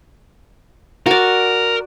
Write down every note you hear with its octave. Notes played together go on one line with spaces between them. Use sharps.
F#4 A#4 D5